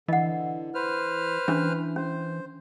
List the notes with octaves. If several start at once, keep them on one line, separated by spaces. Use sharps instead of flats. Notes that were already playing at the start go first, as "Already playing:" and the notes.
D3 E3 D#5 F#5
B4 C5 F6
E3 C#4 D4
C#4 C5